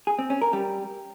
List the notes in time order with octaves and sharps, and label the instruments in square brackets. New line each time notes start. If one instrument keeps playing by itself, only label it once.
[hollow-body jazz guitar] G#4
C4
C#4
A#4
G3